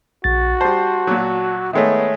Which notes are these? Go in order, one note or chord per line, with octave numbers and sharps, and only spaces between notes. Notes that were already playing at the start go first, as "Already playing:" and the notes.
A#1 F#4 A6
G3 C5 A5
A#2 F#3
D#3 G#3 A3 B3 C#5 E5